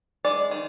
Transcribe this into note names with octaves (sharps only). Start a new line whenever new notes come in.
G#3 D5
D#3